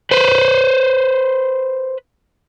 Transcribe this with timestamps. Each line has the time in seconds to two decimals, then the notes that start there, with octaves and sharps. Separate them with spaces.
0.11 B4 C5